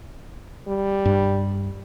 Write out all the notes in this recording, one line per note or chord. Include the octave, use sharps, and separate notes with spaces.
G3
G2